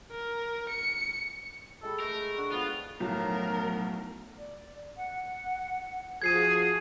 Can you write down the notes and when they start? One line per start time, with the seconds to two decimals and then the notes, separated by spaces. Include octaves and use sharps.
0.12 A#4
0.69 C#7
1.83 G#3 G4 A4 B5
2.00 A3 A#4
2.38 D3 F#4
2.52 B3 F4 C5
3.00 B1 A2 F3 F#3 A3 B3 A#4
4.38 D5
4.97 F#5
6.22 F3 F#4 G#4 G#6 C7 D#7